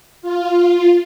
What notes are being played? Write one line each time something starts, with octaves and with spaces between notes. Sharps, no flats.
F4